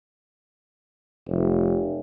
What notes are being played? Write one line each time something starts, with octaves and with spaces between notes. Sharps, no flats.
F1